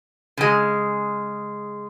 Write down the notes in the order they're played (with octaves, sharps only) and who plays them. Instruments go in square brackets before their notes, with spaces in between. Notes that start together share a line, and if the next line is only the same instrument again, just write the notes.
[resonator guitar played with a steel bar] C#3 G#3